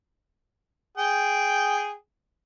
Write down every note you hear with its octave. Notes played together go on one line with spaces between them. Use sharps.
G#4 G5